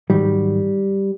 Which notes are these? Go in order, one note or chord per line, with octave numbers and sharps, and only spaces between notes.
G#2 D#3 F#3 G3